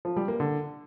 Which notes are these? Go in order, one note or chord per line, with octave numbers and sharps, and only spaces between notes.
F3
G3
A#3
D3